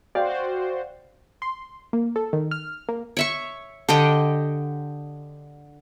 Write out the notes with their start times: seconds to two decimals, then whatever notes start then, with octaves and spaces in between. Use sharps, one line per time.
0.15 F#4 C5 D5 F5 G5
1.42 C6
1.93 A#3
2.16 A4
2.33 D#3
2.51 F6
2.89 A#3
3.17 C#5 E5 C#6
3.89 D3 G4 D#5 G5